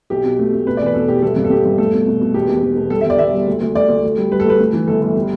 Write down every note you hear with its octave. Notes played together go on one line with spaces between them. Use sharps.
B1 G4
B2
A3
A3
B2 B4
D5
E2
B4
B2 A4
E1 G4
G1 A4
G2
A4
G2 G4
G2
A3 A4
B2
B2
B2
E1 G4
E1
E1
E1
G3 A4
E5
G1
D5
G1 E5
G3
D2
D2
D2 D5
D2
D2
G3
G3 B4
A4
D2 B4
A3
E3
G1 A4
G1
G3